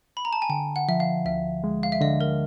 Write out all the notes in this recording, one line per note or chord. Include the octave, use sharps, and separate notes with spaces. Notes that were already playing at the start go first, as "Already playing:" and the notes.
B5
A#5
A5
G#5
D3 G5
F#5
F3 E5
F5
D2 E5
G#3
F5
E5
D3 D#5
A#4